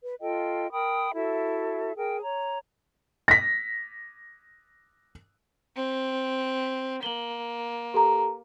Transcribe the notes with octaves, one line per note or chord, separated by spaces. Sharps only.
B4
F4 A4 D#5 G5
A#4 G5 B5 D#6
E4 F#4 A4 E5
G#4 A#4 G5
C#5 A#5
A#6 B6
C4
A#3 F#7 G7
G4 A4 A#5